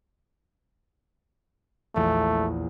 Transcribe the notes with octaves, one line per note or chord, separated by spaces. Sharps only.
A#1 E2 A3